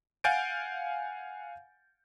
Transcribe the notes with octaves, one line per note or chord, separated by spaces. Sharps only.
F5 F#5 G#5 G6 A6 D7